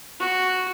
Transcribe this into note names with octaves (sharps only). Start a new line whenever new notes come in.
F#4